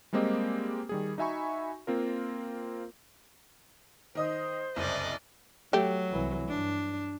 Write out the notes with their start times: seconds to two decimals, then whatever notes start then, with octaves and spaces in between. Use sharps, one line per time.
0.13 G3 G#3 A#3 C4 G4 D#5
0.89 D#3 G3 G#4
1.18 D#4 F#4 E5 G#5 B5 C#6
1.87 A#3 C4 F4 A#4
4.15 D#3 C5 D#5 D#6
4.76 F#1 C2 D5 D#5
5.73 F#3 A3 G4
6.11 C2 E3
6.48 G2 D4